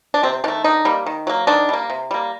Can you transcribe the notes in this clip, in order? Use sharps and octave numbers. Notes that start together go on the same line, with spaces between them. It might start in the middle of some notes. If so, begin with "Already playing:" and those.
D4
C3 C4
D#3 A3 D4
D3 D#4
G3 A#3
D#3
F#3 A#3
D#3 D4
G3 A#3
C3
G3 A#3